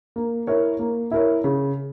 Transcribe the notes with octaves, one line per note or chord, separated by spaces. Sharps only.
A#3
E4 A#4 C#5
A#3
E4 A#4 C#5
C#3